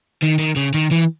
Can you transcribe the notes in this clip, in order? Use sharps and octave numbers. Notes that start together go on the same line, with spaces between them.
D#3
D#3
C#3
D#3
E3